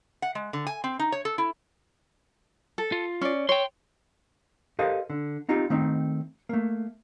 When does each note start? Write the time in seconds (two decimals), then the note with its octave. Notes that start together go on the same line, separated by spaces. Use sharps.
0.22 F#5
0.35 G#3
0.53 D3
0.67 G#5
0.84 C4
0.99 D#4
1.12 C#5
1.25 A4
1.38 E4
2.78 A4
2.92 F4
3.21 C#4 D5
3.49 C#5 G5 C6
4.79 G4 A4 A#4 C5 D#5 F5
5.10 D3
5.49 C4 D#4 F4 G4
5.70 D#3 A3 C4 D#4
6.49 A3 A#3